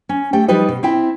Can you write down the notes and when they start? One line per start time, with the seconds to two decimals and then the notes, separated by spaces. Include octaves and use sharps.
0.09 C#4
0.33 A3 G4 G5
0.48 F3 G3 D#4 G4 B4 D#5
0.69 B2
0.83 C4 E4 G5